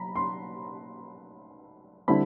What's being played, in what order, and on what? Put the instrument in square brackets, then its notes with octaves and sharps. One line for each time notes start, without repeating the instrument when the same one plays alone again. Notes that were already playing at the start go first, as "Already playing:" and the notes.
Already playing: [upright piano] B1 A#5 B5
C6
D3 G3 C4 E4 B5